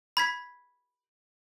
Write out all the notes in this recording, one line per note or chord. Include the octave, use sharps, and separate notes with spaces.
B5 G#6 B6